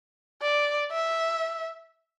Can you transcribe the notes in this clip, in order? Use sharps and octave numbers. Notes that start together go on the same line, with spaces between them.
D5
E5